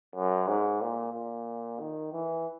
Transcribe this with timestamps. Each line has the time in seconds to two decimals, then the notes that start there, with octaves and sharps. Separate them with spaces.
0.16 F#2
0.48 G#2
0.81 A#2
1.13 A#2
1.80 D#3
2.12 E3